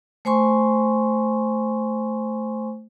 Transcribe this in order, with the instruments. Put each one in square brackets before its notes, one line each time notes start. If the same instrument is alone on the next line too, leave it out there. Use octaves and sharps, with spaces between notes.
[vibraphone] A3 C5 G#5 C6 C#6